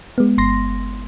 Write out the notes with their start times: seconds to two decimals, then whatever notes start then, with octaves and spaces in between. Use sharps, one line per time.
0.18 G#3 B3
0.38 G1 C6 A#6